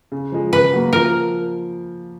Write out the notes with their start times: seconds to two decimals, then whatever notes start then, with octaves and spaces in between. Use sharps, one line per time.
0.12 C#3
0.32 F3 G#3
0.52 C#3 B4
0.73 F#3 A#3
0.93 F3 A#4